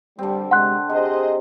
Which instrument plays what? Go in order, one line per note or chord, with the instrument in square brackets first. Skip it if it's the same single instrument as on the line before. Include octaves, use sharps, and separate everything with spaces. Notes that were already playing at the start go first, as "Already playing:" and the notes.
[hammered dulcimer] D3 C4 [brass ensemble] G3
[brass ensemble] C3 G#3 [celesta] F#5 C6 F#6
[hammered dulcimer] C3 [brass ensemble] G#4 C5 D#5